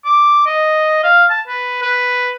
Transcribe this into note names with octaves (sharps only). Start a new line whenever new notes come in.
D6
D#5
F5
A5
B4
B4